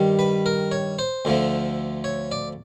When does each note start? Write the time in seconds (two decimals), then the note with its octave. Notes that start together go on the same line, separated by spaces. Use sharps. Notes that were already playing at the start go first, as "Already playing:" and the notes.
Already playing: G2 D#3 G3
0.19 B4
0.46 A#4
0.71 C#5
0.99 C5
1.25 D2 D3 F3 A3
2.04 C#5
2.32 D5